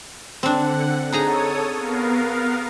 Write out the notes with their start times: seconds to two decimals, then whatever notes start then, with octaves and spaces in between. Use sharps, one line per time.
0.43 D3 C4 D4 F#5
1.12 D#4 G#4 A4 C#5 A#5 D#6
1.75 B3 A#4 F5